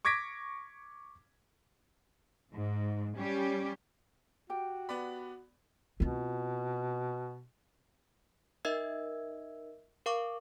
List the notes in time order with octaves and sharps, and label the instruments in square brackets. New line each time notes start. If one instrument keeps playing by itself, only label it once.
[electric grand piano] C#6 D6 G#6 A#6 B6 D7
[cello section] G#2
G3 C#4 G4
[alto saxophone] F#4 [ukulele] G4 G5
[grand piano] B3 D5 B5
[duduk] B2 [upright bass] C4 F4
[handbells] D#4 A#4 D#5 E5 E6 G#6
A#4 F5 C#6 D6